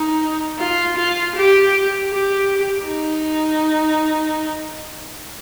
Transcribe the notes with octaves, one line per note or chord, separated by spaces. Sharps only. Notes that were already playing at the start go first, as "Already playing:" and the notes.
Already playing: D#4
F4
F4
G4
G4
D#4